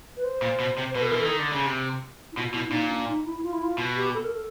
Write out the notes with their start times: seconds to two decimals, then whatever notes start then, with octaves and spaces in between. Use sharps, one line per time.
0.17 B4
0.24 C5
0.42 A#2
0.60 B2
0.78 C3
0.91 C5
0.95 B2 B4
1.02 A4
1.07 A#4
1.11 E3
1.19 A4
1.25 D#3
1.39 D3
1.52 C#3
1.66 C3
2.32 E4
2.37 B2 F4
2.54 B2 E4
2.68 D4
2.72 A#2 D#4
2.89 D4
3.08 D#4
3.25 E4
3.43 F4
3.53 E4
3.63 F4
3.78 B2
3.96 G4
4.14 A4
4.24 A#4
4.34 A4